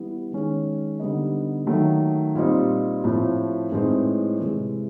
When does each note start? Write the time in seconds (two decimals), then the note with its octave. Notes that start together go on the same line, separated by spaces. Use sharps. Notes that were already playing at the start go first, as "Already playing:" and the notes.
Already playing: E3 G3 B3 E4
0.31 D#3 G#3 C#4
1.00 D3 G3 B3 D#4
1.67 D#3 F#3 A3
2.35 A#2 G3 C4 D#4
3.04 A2 F3 A3 C4
3.72 A2 E3 G#3 C4 D#4
4.39 C3 E3 G#3